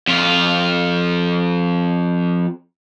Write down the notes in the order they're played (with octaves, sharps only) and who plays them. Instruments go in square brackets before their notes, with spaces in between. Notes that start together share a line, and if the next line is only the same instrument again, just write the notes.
[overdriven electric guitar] F2 F4